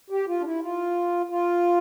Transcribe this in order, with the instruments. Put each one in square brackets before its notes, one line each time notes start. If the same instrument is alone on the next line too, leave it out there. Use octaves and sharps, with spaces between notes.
[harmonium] G4
F4
D4
E4
F4
F4